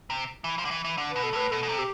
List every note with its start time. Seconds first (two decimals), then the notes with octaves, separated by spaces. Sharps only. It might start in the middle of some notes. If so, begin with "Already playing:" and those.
0.10 C3
0.44 E3
0.59 F3
0.65 D3
0.71 E3
0.85 E3
0.98 D3
1.11 B2 B4
1.23 A4
1.33 A2 B4
1.51 B2 A4
1.63 B2
1.69 C3
1.78 G4